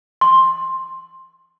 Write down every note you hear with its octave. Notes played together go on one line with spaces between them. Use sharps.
C6